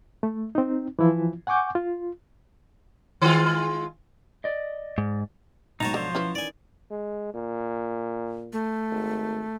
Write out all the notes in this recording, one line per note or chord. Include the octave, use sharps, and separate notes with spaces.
A3
C4 D#4
E3 F3 E4 F4
F#5 G#5 C#6 D6 G6
F4
D#3 G#3 F4
D5 D#5
G#2
B1 G#2 D#4 C#5 A5 A#5
D3 F3 C5
C#4 E4 B4
D#3 D5 G#5
G#3
A#2
A3
G#1